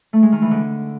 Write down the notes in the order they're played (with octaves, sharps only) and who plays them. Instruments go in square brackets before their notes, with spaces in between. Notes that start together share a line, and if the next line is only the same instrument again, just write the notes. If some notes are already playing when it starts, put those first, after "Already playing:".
[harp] A3
G#3
D#3
E3
D3